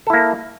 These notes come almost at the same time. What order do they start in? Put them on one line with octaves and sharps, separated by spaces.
A4 E4 A#3